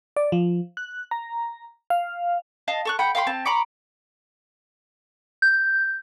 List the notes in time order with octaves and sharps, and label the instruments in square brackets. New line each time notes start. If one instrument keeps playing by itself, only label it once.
[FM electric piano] D5
F3
F#6
A#5
F5
[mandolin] D#5 F5 A5
A4 C#6 F#6
F#5 G5 B5
F5 G5 B5 C6
C4 A5
A#5 B5 C#6 D6
[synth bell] G6